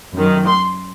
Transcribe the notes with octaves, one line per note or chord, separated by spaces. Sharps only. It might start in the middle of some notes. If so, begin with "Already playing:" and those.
F#2 D#3
C6